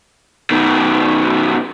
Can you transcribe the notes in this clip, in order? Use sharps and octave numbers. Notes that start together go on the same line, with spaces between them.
B2 D#3